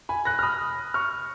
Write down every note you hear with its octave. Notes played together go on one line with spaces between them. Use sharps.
G#5 B5
F#6 A#6
F6
B5 D#6
C#6 F6